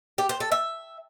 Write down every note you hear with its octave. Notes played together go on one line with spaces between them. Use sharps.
G4
C5
A4
E5